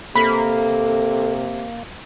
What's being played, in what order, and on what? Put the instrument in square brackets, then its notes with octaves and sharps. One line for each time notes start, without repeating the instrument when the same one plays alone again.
[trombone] C3 [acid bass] A#3 [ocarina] A4 [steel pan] B5